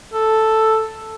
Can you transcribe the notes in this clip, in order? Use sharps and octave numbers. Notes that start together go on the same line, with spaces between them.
A4